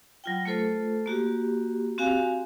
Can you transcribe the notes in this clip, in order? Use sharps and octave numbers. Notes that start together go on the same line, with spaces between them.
F#3 F4 G5
A3 F4 A4 C5
A#3 F#4 G4
C4 F#4 G4 F5 G#5